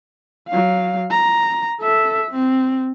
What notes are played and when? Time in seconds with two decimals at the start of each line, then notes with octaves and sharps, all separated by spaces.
0.49 F#3 F5
1.11 A#5
1.81 A4 E5
2.31 C4